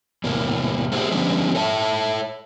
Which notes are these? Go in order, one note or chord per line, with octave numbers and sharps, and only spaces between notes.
E2 A2 C3 A#3
A3 A#3 C4 F4 G4 G#4
D3 F3 G3 B3 C#4
A4 C#5 E5 A5